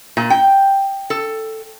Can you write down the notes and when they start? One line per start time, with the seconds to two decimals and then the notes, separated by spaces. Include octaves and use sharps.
0.17 A#2
0.30 G5
1.10 A4